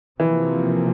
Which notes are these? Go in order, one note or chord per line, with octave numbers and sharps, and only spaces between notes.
C3 E3 F3 A#3